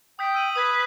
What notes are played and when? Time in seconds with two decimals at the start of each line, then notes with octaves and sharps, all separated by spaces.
0.19 G5 D#6 G6 B6
0.34 E6 D#7 F#7
0.55 B4 D#6 G#6 B6
0.71 D#6